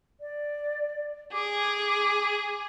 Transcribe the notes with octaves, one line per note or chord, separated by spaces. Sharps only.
D5
G#4 D6